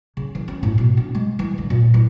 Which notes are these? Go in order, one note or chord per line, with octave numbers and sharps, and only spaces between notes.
C#3
E3
C#4
A2
B2
D4
G#3
E3
D3
A#2
E3